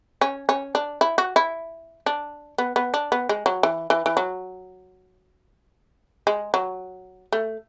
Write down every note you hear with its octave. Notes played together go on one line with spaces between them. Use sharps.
C#4
C#4
D4
E4
F#4
E4
D4
B3
B3
D4
B3
G#3
F#3
E3
E3
E3
F#3
G#3
F#3
A3